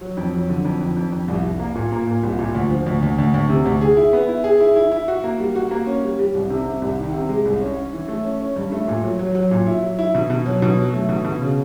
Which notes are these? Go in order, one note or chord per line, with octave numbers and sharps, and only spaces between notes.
F#3
F2
F#3
D3
F2
F2
F2
F2
C2
C2
A#3
A#2
A#3
A#2
C2
A#2
D2
F3
D2
D2
D2
D2
C3
D2
G#4
E4
B3
E4
G#4
E4
E4
E4
F#4
A#3
G3
F#4
A#3
C#4
G3
G3
C2
C3
C3
C2
D#3
C3
G#3
C2
C#4
C#4
E3
A3
C#4
C#4
G2
A3
A#2
F#3
F#3
F#3
A#2
E4
F#3
E4
B2
B2
F#3
B2
F#3
A3
B2
B2
C#3